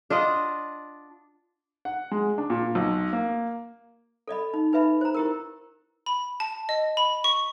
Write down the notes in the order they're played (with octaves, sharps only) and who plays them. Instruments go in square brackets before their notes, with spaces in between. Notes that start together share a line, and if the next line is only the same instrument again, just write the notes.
[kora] D4 F4 D#5 F#5
[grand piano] F#5
G#3
D4
A#2
B1
A#3
[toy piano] A4 D5 D#5 B5
D#4
D#4 B4 E5 B5
C5 A#5
E4 G4 A#4
[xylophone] B5
A5
D#5
B5
C#6